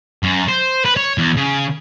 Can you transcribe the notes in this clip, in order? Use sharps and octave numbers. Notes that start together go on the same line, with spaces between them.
F#2
C5
B4
C#5
E2
C#3